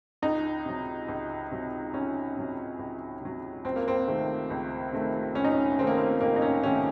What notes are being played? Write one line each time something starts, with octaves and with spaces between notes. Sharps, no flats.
C#2 D#4
C3 F#3
C#2
C3 F#3
C#2 C#4
C3 F#3
C#2
C3 F#3
C#2 C4
A#3
C4
C3 D#3 A3
C#2
C3 D#3 A3
C#2 C#4
D#4
C#4
C3 D#3 A3 C4
A#3
C4
C#2 A#3
D#4
C#4
C3 D#3 A3 C#4